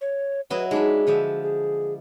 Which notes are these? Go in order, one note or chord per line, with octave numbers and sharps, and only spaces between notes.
C#5
F#3 E4 B4 D#5
G#3 D4 D#4 B4
D3 F3 G#4 E5
G#4